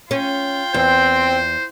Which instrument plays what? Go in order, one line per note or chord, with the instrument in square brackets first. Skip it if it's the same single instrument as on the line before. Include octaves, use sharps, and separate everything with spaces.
[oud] C#4 [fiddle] F4 G5
[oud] E2 [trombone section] C4 [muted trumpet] C5